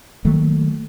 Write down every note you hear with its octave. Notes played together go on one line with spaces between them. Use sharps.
D#3 F#3 A3 A#3